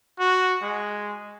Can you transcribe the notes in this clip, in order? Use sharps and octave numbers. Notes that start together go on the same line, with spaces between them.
F#4
G#3